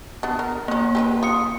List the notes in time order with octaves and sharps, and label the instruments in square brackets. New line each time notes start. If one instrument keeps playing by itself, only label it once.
[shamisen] B3 D4
A#4
[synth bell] A#3 [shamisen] B3 C#4
[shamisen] G4 G#4 B4
[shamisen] F4 [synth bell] D#6 C#7